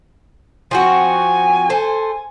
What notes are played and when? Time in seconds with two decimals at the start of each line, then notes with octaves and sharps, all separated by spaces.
0.71 F3 C4 F#4 G#5
1.70 A4 C5